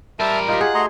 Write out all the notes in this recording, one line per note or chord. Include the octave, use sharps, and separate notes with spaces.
G3 A#4 C5 E5 A5
D#4 F4 G4
G#4 F#5
A3 F#4 D#5 A#5 C6